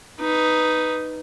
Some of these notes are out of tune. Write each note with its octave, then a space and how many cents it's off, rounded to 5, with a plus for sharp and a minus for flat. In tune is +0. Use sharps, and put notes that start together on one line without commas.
D#4 +0 B4 +0